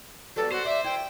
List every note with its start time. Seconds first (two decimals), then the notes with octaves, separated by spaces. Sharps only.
0.36 F#3 G3 B3 A4
0.52 F#4 C5
0.65 D5 E5
0.84 E4 G5